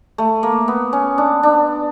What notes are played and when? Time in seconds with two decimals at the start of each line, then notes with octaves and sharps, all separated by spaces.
0.18 A3
0.43 A#3
0.68 B3
0.93 C#4
1.18 D4
1.43 D4